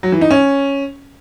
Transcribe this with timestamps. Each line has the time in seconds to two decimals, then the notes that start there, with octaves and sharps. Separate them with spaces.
0.03 F#3
0.12 E3
0.21 D#4
0.31 C#4